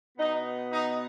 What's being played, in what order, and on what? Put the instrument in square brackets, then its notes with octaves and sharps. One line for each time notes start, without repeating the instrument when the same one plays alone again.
[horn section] B2 B3 D#4
D#4